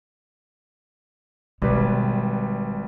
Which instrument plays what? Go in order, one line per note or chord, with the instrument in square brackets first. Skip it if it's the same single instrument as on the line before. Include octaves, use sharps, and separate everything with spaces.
[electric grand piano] G#1 G3 B4 [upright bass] B2